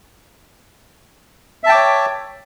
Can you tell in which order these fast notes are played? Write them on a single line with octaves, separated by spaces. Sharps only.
E5 A5 G5 D6 C#5